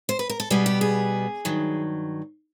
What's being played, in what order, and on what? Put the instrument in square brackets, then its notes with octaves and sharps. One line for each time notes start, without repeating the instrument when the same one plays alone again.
[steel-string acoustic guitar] C5
B4
A#4
A4
B2 G3 B3 G#4
G4
G#4
G2 D#3 F#3